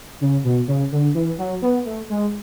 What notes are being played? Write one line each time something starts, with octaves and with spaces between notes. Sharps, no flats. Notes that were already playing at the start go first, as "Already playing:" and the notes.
C#3
B2
C#3
D3
E3
F#3
B3
A3
G#3